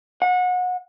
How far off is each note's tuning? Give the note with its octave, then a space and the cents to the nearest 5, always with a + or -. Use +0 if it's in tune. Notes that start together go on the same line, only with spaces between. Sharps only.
F#5 -30